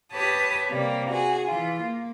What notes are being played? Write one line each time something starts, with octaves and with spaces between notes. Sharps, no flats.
G4 B4 C#5 A5 D#6
C3 G3 A#3
F#4 G#4
E3 F4
A#3